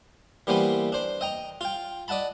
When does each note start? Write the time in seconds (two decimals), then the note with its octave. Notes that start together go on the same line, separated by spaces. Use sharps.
0.47 E3 G3 A#3 B3 B4 C5
0.92 D4 C5
1.21 D#5 G5 A#5
1.61 F4 G5
2.08 D5 D#5 F#5 A5 B5